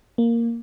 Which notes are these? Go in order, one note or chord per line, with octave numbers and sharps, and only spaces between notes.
A#3